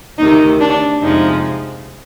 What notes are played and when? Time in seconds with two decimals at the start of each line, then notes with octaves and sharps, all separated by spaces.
0.18 D2 C3 D#3 D#4
0.60 D4
1.01 F2 C3 F3 G#3 D#4